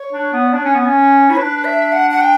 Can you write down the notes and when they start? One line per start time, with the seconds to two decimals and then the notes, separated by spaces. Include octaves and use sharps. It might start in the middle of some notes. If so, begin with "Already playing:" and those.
Already playing: C#5
0.13 D4
0.33 B3
0.46 D5
0.53 D4 C#5
0.65 C#4
0.75 B3
0.85 C#4
1.28 E4 C#5
1.37 D4 B4
1.65 E5
1.93 F#5
2.11 F#5
2.21 G5